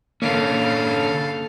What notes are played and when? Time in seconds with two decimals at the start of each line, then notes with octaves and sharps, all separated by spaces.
0.22 D3 A#3 C#4 A4 F5